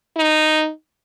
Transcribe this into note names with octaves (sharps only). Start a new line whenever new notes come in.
D#4